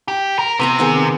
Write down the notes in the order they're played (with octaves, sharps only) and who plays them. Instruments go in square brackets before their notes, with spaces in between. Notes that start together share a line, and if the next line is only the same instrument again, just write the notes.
[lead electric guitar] G4
A#4
[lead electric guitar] C3 [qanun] B3 G#5 A#5
[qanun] D#3 B3 G#4